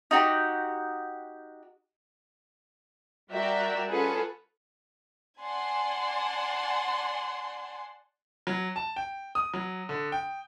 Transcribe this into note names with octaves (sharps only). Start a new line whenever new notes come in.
D#4 F#4 G4
G3 F#4 A#4 D5 E5 G5
C#4 F4 G#4 A4 B4 F#5
D5 F#5 G#5 A5 C6
F#3
A5
G5
D#6
F#3
D3
G5